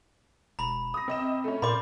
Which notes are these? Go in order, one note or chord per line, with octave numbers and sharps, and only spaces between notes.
E1 A#5 B5
D#6 A#6
C3 C4 D#5 E7
A3 C#4
A#2 A#4 C5 D5 B5 D6